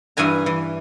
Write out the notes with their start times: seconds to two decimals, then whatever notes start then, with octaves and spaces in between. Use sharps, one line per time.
0.17 G2 E3 B4 G#5 A#5
0.46 E3